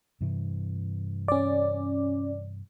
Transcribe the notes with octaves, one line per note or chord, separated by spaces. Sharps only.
G2 C3 E3
C#4 D5